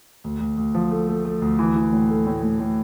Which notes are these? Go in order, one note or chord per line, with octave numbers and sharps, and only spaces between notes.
D2
D2
D2
F3
A3
A3
A3
D2
E3
E3
A2
A3
A2
A2
A2